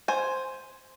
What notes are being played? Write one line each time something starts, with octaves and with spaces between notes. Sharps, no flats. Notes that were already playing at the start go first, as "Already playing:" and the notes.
C5 G#5